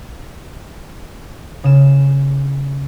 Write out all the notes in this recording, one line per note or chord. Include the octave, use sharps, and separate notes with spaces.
C#3 E7